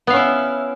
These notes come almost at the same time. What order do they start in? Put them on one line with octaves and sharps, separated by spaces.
B3 F5 C#4 E4